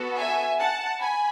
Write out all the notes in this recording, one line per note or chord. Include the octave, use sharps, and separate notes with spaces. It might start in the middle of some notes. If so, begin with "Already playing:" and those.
Already playing: B3 F#4 A4
E5 G#5
F#5 A5
G#5 B5